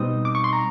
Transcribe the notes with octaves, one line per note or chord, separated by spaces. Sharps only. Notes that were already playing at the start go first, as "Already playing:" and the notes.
Already playing: B2 G3 C4 D#4 D#6
D6
C#6
C6
A#5